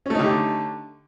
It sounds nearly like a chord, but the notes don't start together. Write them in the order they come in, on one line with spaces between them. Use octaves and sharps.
C#4 A3 D#4 D3 G4